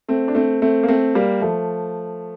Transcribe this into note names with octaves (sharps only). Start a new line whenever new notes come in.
A3 C4
D4
A3 C4
A3 C4
A#3
A3 C4
G3 A#3
F3 A3